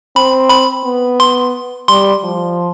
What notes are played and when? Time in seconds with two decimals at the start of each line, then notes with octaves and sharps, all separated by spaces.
0.16 C4 B5
0.50 B5
0.85 B3
1.20 C6
1.88 G3 C6
2.23 F3